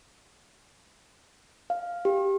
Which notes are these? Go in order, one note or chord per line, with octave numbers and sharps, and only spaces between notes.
F5
G4